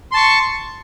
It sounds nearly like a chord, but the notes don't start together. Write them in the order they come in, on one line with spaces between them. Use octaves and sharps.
C6 A5 C#6